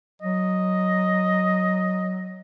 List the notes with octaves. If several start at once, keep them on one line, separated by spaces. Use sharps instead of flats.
F#3 D#5